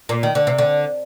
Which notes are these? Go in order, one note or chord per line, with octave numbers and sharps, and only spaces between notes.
A#2
D#3
D3
C3
D3